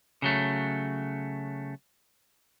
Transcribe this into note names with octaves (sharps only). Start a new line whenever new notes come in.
C#3 F#3 A3